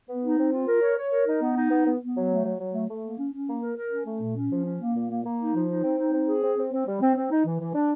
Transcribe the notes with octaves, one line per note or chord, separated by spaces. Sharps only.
B3
D#4
C4
F4
A#4
C#5
C#5
A#4
D#4
B3
D#4
B3
B3
B3
F#3
A3
F#3
F#3
A3
A3
A#3
C#4
C#4
A#3
A#4
A#4
C#4
A3
A#2
C#4
F3
C#4
A#3
A#2
A#3
A#3
D#4
F3
D#4
C4
D#4
C4
G#4
C4
C4
C4
G3
C4
C4
D#4
E3
E3
D4